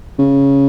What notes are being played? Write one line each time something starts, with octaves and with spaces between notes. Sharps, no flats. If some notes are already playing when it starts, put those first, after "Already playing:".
C#3